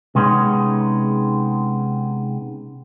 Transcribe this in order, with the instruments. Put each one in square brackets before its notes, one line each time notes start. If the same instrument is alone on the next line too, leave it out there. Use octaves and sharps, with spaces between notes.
[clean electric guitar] C3 G#3 B3 C#4 D#4